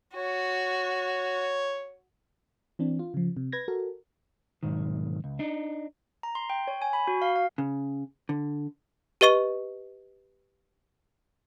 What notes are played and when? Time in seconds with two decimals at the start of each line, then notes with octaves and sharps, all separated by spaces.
0.16 F#4 C#5
2.79 E3 C4 D4
2.99 F4
3.14 C#3 F3
3.37 C3
3.52 B4 G#6 A#6
3.68 F#4 A4 A#4
4.63 B1 G#2 D#3
5.24 C#2
5.39 D4 D#4
6.23 A#5
6.35 C6
6.50 G5
6.68 C#5
6.82 G#5
6.93 B5
7.07 F#4
7.22 F5
7.36 F5
7.58 C#3
8.29 D3
9.21 G4 B4 D#5 C#6 D#7